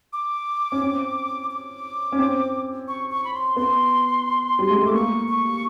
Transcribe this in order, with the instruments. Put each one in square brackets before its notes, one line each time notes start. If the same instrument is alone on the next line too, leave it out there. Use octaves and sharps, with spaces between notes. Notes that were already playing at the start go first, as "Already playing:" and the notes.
[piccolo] D6
[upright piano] C#4
C4
[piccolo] D6
[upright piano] C#4
C4
[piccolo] C#6
C#6
B5
C6
[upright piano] B3 [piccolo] C6
[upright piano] G3
G#3
[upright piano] A3 [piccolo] D6
[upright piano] A#3 [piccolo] C#6
[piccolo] C#6